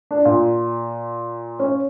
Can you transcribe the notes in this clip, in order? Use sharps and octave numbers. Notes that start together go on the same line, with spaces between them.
D4
A#2
C#4